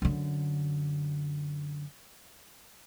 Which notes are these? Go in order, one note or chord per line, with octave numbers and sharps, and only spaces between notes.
F#2 D3